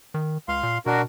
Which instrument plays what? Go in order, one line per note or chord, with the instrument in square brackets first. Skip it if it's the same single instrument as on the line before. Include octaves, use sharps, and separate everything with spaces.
[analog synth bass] D#3
[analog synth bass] C#2 [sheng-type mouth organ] F5 C6
[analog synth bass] A#2
[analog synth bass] B2 [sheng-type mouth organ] D4 F#4 A#4